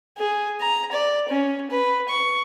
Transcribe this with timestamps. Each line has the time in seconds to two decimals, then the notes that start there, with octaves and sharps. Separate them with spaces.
0.18 G#4
0.61 A#5
0.92 D5
1.29 C#4
1.70 B4
2.08 C#6